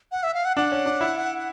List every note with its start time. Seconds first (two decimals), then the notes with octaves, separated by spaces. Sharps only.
0.12 F#5
0.23 E5
0.34 F5
0.45 F#5
0.57 D4 F#5
0.72 C#4
0.86 D4
1.01 E4